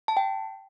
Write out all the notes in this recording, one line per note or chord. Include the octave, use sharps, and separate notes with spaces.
A5
G5